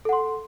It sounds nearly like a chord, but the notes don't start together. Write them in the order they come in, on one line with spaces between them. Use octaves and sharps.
A4 F#5 C6